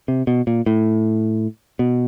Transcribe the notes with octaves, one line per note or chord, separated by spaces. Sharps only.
C3
B2
A#2
A2
B2